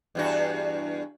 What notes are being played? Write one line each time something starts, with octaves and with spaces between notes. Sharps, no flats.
E2 G2 F#4